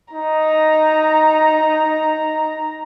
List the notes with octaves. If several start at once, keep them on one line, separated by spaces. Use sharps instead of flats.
D#4 A#5